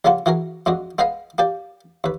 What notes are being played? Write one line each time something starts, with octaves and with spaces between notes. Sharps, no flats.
A#1 C#3 G3 A#3 F4 F#5
E3 F#4 G#4 A#4
F2 G#3 D4 F#4
G#3 B3 G#4 B4 D#5 F5
A#3 G4 D5
D#2 B4